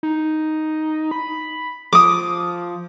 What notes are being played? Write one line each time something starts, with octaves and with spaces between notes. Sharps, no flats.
D#4
B5
F3 D6 D#6